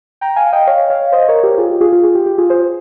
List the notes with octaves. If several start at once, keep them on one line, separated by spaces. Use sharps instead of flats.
G5 A#5
F5 G#5
D#5 G5
C#5 F5
C#5 F5
C5 D#5
A#4 C#5
G4 A#4
F4 G#4
G4
F4 G#4
F4
F4 G#4
G4
G4
F4 G#4
G#4 C5